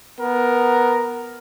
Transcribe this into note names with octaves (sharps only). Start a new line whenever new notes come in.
B3 A#4